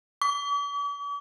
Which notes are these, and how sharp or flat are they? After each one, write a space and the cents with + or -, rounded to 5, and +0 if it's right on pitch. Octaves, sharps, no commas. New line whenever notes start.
D6 -45